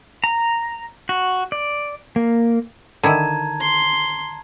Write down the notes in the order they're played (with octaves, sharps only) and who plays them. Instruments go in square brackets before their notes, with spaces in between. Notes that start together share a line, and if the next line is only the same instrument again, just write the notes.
[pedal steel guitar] A#5
F#4
D5
A#3
[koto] D3 D#3 E4 [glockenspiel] A5 A#5 G#6
[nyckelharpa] C6